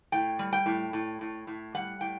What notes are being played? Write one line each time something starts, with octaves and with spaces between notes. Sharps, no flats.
A2 G5
G3
G5
A2
A2
A2
A2
G3 F#5
A2 G5